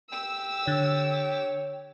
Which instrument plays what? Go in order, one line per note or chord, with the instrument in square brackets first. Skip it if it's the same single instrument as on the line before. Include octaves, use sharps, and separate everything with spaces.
[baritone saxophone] G4 [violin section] E6
[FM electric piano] D3 [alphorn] C#5